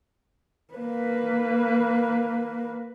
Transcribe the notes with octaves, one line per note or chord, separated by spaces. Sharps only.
A#3 B4